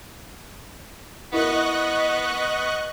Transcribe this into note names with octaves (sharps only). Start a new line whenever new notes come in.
B3 E4 A#4 D#5 C#6 F#6